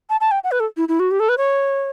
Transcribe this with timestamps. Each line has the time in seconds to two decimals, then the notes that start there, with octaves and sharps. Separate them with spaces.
0.10 A5
0.21 A5
0.31 G5
0.44 F#5
0.51 B4
0.60 A4
0.77 E4
0.89 E4
1.00 F#4
1.11 G4
1.20 A4
1.29 B4
1.38 C#5